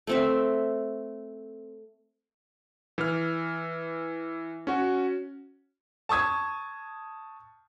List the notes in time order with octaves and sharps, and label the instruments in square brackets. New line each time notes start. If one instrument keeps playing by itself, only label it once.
[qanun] A3 C4 E5
[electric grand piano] E3 F6
C#4 F#4
[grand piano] A5 C#6 D#6 G#6